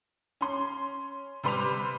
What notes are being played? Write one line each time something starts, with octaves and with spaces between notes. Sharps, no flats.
C#4 C6
C3 G3 B4 C6 D6 F7